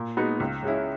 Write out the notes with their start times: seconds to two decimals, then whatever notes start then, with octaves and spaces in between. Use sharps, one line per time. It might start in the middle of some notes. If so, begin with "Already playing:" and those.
Already playing: A#2
0.17 G#3 B3 D#4 F#4
0.40 C#2
0.63 C#3 G#3 C#4 E4